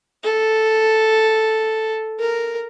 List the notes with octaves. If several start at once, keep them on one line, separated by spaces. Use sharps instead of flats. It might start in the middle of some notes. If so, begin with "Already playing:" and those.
A4
A#4